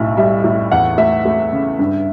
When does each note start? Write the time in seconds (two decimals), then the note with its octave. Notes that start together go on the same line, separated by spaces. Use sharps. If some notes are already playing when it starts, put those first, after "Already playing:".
Already playing: B1 A2 E5
0.17 G3 E5
0.44 A2
0.72 E2 F#5
0.98 A3 E5
1.25 A3
1.53 C#3
1.79 G2